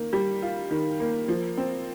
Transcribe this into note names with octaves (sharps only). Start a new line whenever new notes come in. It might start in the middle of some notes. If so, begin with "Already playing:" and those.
Already playing: D#3 A#3
G3
F4
D#3
A#3
F3
C4